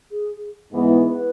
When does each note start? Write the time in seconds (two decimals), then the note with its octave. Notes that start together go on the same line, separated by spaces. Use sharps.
0.11 G#4
0.70 G#2 E3 G#3 B3 E4
1.09 B4